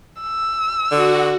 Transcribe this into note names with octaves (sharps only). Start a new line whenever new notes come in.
E6
D3 F#4